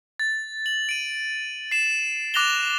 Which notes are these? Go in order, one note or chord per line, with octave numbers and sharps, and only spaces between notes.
A6
F#7
D7 D#7
C7 E7
D6 F#6 A#6 F7 G7